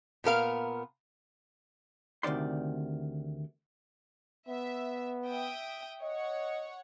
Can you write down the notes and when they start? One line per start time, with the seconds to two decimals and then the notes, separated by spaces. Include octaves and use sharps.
0.24 A#2 B3 A#4 F5
2.23 D2 C3 D#3 D5 C6
4.49 B3 E5
5.26 E5 G5 D#6
6.03 C#5 D#5 F#5